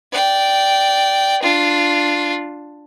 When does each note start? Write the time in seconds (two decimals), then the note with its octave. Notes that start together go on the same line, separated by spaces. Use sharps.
0.12 D5 G5
1.43 D4 F4